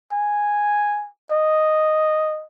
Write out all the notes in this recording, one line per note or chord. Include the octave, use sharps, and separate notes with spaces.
G#5
D#5